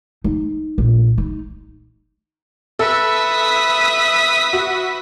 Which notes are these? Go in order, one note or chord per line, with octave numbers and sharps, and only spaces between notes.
D#4
A#1
D#4
A4 B4 E5
D#6 B6
F#4